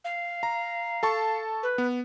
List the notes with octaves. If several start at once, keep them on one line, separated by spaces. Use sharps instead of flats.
F5
A#5
A4 A5 C#6
B4
B3